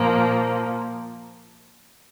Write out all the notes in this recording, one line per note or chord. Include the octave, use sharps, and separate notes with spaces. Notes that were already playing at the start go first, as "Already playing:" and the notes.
Already playing: A#2 F3 A#3